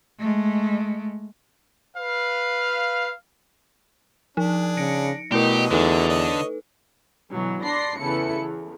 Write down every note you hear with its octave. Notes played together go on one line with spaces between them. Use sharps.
G#3 A3
B4 F5
F3 D4 D#4 G#4
C#3 A#6 C#7 D7
B2 F#3 A3 E4 G4 A#4 D#5
E2 D3 D#4 A4 B4
C#5 D#5
B2 D3 E3 F#3
D4 D5 B5 C6 A#6 C7
E2 C#3 E4 A4 B4 C#7
E2